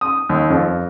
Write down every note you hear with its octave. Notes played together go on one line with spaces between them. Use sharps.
D#6
D#2
F2